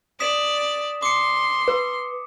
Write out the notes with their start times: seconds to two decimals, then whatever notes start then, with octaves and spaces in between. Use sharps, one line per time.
0.20 D5 D#6 B6 E7
1.02 C6 D6 C#7
1.68 B4